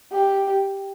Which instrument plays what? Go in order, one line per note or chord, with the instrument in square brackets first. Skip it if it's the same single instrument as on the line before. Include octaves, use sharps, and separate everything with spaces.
[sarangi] G4